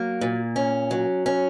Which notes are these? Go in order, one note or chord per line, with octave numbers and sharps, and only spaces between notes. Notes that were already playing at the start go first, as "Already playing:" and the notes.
Already playing: F#3 A#3
A#2
C#4
F#3
C#4